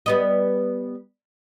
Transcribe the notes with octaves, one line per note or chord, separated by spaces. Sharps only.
G3 B3 D#5